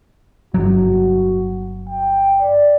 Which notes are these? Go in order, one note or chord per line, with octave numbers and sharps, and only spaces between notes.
G1 F#3 F#4
G5
D5